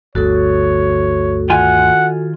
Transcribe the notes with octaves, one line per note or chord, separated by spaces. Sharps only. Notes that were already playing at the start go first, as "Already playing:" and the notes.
G1 D2 F#4 A4 C#5
D#3 F4 F#5 G#5